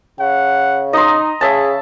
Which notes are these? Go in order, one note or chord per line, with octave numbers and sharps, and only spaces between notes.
C#3 F#5
D#4 D#5 A#5 C6
C#3 G#4 E5 A5